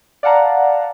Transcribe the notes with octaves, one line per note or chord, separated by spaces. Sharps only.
D5 F5 F#5 A5 A#5